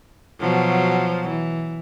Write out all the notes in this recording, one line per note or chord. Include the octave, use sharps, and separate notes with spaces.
B2 F3 F#3
E3